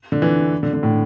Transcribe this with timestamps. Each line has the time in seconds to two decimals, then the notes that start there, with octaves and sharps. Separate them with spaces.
0.12 D3
0.22 E3
0.63 D3
0.73 D3
0.83 A2